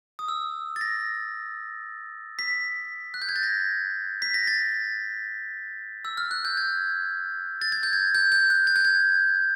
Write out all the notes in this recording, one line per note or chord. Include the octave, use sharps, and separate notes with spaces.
D#6
E6
A6
A#6
B6
F#6
G6
G#6
A6
A#6
B6
A#6
A6
E6
F6
F#6
G6
G#6
A6
G#6
G6
G#6
G6
G6
F#6
G#6
G6
G#6